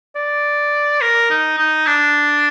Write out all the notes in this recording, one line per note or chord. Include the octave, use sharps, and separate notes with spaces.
D5
A#4
D#4
D#4
D4